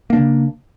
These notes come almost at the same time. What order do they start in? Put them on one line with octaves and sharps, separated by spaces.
A#3 D4 C#3